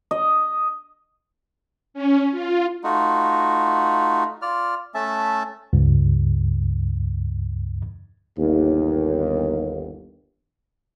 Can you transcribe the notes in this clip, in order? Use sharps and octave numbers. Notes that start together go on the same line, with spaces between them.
D#5
C#4
F4
A3 D#4 F4 F#4
F4 D5 F6
A3 C#4 E5 A5
C#2 G2
G1 D#2